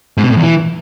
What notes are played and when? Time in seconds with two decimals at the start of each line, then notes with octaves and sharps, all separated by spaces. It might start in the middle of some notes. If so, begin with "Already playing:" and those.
0.17 G#2
0.24 B2
0.30 A2
0.37 E2
0.43 E3